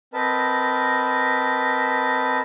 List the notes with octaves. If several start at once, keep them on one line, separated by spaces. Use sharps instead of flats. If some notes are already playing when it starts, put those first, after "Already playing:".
C4 A#4 B4 D#5 A5